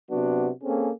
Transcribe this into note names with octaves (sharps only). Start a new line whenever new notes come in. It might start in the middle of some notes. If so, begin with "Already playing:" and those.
C3 F#3 B3 D4 F#4
A#3 C4 C#4 G#4 A4